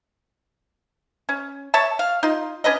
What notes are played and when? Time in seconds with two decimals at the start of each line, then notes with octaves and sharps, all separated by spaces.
1.29 C#4
1.74 C#5 E5 A5
1.99 F5
2.23 D#4 F4
2.64 C#4 D4 B4 D#5